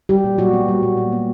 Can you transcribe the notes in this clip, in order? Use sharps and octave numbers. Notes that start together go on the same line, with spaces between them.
G3 G4
A#2
A#2 F#3 F#4
B3
G3
A#2
A#2
B3